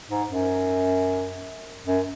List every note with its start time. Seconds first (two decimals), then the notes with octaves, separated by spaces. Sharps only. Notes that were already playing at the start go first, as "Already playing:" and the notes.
0.10 G#2
0.28 F#2
1.86 F#2